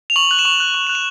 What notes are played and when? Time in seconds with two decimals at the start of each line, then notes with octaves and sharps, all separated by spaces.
0.10 F7
0.16 C#6 F#7
0.31 F#6 F#7
0.39 E7
0.45 C#6 F7
0.60 F#6
0.74 C#6
0.87 F#6 F7
0.95 E7